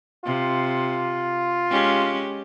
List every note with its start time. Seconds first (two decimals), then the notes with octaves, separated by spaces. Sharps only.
0.25 C3 F4
1.71 G#3 C#4 G4